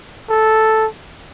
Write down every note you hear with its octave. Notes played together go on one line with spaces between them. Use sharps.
A4